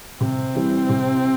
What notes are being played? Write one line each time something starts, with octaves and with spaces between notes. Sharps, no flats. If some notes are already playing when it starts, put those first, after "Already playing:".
C3 C4
E3 G3
C3